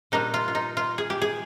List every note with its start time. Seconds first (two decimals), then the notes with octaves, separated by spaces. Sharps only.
0.12 A#2 G3 A#3 D4 D#4
0.34 F4
0.48 F4
0.55 D#4
0.77 F4
0.98 G#4
1.10 G4
1.22 G#4